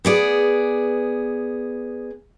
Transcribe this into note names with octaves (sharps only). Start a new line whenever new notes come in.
B3 G#4 D5